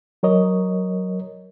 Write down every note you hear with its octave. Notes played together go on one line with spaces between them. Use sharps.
F#3 A#4 C#5 D#5